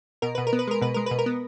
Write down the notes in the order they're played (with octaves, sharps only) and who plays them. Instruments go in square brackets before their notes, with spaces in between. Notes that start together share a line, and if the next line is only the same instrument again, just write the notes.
[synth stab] B2 A#4
B2 B4
A#4
B3
B4
G#3 A#4
B2 B4
G#3 A#4
B2 B4
A#4
B3